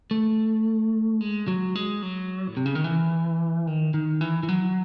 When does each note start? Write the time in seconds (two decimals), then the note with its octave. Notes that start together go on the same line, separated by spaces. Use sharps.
0.11 A3
1.21 G#3
1.48 F#3
1.75 G#3
2.02 F#3
2.48 A2
2.57 C3
2.66 C#3
2.75 D#3
2.84 E3
3.67 D#3
3.94 D#3
4.21 E3
4.43 E3
4.49 F#3